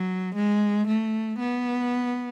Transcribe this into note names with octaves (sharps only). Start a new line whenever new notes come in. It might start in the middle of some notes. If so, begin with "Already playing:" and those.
Already playing: F#3
G#3
A3
B3